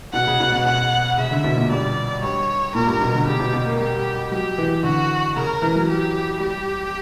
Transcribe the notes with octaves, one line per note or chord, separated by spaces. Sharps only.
B2 F#5
C#3
B2
B2
B2 F#5
C#3 E5
D3
B2
A#2
G2 D5
G2 C#5
A#2 A#4
G2
B2
D3
C#3 G4
B2
B2
A#3
G3 G4
F#3 G4
E3
D3 F#4
C#3 A#4
E3
F#3
G4
G3 G4